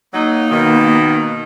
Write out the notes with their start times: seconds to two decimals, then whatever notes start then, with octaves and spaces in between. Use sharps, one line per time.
0.14 F#3 A#3 D#4
0.51 B2 D#3